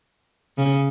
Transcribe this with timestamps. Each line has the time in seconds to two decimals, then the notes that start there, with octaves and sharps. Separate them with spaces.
0.58 C#3